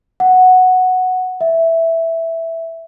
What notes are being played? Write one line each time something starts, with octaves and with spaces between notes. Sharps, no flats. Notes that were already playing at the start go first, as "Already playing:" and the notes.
F#5
E5